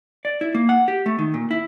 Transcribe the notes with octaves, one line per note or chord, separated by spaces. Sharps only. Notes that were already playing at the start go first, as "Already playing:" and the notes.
D5
E4
A#3
F#5
G4
A3
D#3
A#2
E4